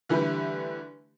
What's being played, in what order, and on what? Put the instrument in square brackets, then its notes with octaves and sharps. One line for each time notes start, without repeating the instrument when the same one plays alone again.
[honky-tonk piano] D3 E3 G3 A3 G4 B4